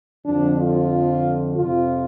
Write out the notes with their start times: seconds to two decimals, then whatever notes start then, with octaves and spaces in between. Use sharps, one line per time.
0.25 F2 D3 F3 D4
0.58 F4
1.56 F2 C3 F3 F4